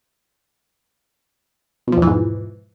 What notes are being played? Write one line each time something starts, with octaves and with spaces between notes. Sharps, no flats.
E2 G#2 B2 E3 F3